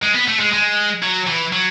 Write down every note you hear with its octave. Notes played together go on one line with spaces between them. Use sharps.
G#3
B3
A3
G#3
G#3
F#3
E3
F#3